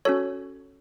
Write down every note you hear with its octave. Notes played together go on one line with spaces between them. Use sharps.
C#4 F#4 A4 C#5